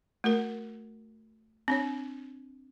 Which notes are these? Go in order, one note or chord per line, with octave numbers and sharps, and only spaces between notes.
A3 F#4 A#4
C4 D4 C#5